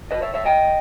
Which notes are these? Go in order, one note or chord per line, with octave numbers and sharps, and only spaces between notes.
B4 D#5
C#5 E5
C#5 E5
D#5 G5